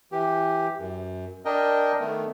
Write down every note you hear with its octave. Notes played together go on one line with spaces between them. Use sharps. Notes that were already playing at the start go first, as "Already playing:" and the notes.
E3 G4
F#2
D4 A#4 D#5 G5
D#3 A3 B3